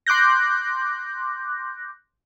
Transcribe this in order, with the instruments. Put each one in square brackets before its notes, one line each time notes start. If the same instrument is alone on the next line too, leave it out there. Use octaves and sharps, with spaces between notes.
[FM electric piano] C6 D6 F#6 G6 A#6